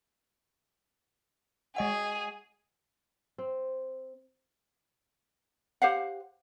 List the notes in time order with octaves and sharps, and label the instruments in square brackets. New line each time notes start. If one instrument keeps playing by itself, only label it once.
[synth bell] G#3 D#5 F#5 [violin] G#4
[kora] C4
[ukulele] G4 C5 F5 F#5